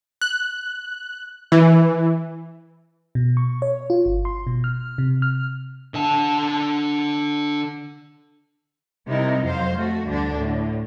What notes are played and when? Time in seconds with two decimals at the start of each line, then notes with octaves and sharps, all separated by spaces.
0.22 F#6
1.52 E3
3.15 B2
3.37 C#6
3.62 C#5
3.90 F4
4.06 G1
4.25 C6
4.47 B2
4.64 F6
4.98 C3
5.22 F6
5.94 D3 A5
9.07 C3 G3 D#4 E4 A#4
9.44 F2 F#3 C5 F5
9.77 A3 F#4
10.05 D2 G2 D3 D4
10.36 A2 D3